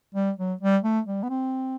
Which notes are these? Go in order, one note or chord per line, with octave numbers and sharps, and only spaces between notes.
G3
F#3
G3
A3
G3
B3
C4